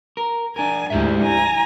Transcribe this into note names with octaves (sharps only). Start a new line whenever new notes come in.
A#4
D4 A#4 G#5
D2 G#2 E4 G4 E5
G#5 A#5